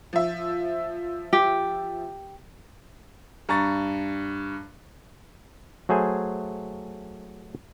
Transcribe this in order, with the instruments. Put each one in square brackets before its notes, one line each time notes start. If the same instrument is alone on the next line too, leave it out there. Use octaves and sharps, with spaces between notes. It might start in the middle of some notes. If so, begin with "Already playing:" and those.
[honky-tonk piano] F3 E5
[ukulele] G4
[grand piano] G2 A#5 C#6 A6
[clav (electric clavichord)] F#3 A3 G#4 C5 G#5